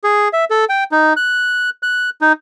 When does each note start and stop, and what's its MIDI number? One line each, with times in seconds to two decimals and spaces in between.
0.04 0.28 68
0.33 0.45 76
0.50 0.65 69
0.69 0.84 79
0.92 1.13 63
1.17 1.70 90
1.83 2.10 90
2.21 2.33 63